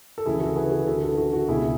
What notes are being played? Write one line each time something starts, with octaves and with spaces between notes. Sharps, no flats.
A4
D2 C#3 E3 E4 G#4
F#4 A4
G#4 B4
G#4 B4
D2 D3 F#4 A4
F#4 A4
F#4
F#4
C#2 B2 E4 G#4